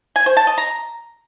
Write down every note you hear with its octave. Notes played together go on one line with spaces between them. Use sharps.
G#5
C5
A5
D#5
A#5